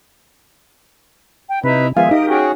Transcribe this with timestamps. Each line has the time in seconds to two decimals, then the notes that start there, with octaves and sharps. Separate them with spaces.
1.49 G5
1.64 C3 D#4 E4 B4
1.97 D#3 F3 G#3 B3 E5 F5 G#5
2.11 D#4 G4 A#4 D#5
2.28 C#4 F#4 G#4 G5